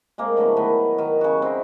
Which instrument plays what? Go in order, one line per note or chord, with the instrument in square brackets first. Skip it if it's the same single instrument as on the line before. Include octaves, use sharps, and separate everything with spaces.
[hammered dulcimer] G#3 A#3 C4
A2 D3 F#3 B3
D#3 B3 D#4
D#3
C#3 F#4
C4 D#4 E4